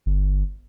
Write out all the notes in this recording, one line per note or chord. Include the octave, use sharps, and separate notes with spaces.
G1